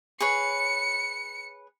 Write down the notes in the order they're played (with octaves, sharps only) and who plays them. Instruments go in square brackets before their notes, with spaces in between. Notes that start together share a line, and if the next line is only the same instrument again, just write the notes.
[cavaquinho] G#4 B4 C#5 [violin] C#7